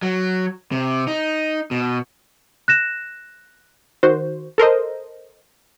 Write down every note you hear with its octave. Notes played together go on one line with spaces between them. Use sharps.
F#3
C3
D#4
B2
F#6 A#6 E7
D#3 F#4 C5
A4 A#4 C5 D#5